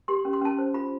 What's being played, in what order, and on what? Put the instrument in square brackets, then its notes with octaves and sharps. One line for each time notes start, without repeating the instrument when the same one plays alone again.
[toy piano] G4 C6
C#4
C6
C#4 A5
C5
F4 B5